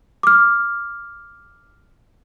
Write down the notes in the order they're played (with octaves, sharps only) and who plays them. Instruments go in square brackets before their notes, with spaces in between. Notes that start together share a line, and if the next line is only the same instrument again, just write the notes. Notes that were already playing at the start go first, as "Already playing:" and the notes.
[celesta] D6 F6